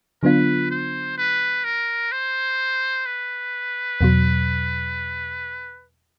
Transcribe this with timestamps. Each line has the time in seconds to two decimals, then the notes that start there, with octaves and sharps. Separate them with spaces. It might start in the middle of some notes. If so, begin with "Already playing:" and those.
0.23 D3 F#3 B3 D4 F4 B4
0.70 C5
1.18 B4
1.64 A#4
2.12 C5
3.06 B4
4.01 E2 B2 F#3